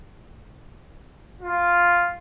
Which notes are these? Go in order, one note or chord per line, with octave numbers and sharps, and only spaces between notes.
F4